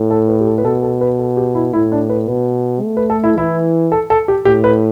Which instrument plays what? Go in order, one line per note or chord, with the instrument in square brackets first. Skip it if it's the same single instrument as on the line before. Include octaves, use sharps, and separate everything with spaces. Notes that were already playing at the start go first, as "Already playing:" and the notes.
Already playing: [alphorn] A2
[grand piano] A4
B4
G4
A4
B4
[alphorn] B2 [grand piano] A4
[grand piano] A4
B4
A4
G4
E4
[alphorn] A2 [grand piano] E4
[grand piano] D4
B4
[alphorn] B2 [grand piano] B4
[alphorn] A3
[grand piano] B4
A4
E4
[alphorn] E3 [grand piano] E4
[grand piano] A4
A4
G4
[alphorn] A2 [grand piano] G4
[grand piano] B4